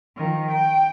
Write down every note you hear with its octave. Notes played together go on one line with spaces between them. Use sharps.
D#3 F3
G5